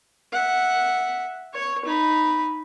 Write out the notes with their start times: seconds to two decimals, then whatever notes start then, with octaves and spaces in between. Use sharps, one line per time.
0.33 E5 F#5
1.54 C#5 C#6
1.85 D#4 B5